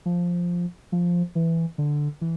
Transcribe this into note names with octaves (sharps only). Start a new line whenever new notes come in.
F3
F3
E3
D3
E3